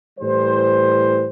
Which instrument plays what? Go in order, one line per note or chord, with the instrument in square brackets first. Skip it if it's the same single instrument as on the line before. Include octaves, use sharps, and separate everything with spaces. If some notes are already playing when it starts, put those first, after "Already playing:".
[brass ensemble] A2 E3 G3 C5